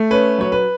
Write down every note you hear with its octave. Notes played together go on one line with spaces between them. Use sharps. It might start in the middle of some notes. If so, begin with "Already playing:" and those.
Already playing: A3
C#4 B4
F#3 C#5
B4